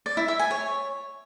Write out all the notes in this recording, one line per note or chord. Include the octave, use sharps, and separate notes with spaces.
D5
E4
E5
G#5
C#5